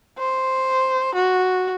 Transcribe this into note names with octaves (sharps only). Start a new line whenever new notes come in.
C5
F#4